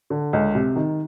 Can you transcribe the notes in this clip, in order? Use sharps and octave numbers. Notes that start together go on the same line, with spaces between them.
D3
C#2
C3
D#3